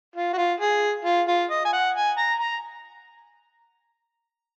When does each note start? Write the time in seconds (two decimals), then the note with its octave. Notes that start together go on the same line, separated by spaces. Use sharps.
0.16 F4
0.33 F#4
0.38 F4
0.60 G#4
1.05 F4
1.28 F4
1.50 D#5
1.65 G#5
1.73 F#5
1.95 G#5
2.18 A#5
2.40 A#5